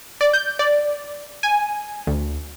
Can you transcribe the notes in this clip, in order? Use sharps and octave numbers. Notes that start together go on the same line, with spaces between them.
D5
G6
D5
G#5
D2